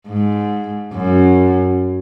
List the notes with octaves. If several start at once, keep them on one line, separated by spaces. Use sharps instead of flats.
G#2
F#2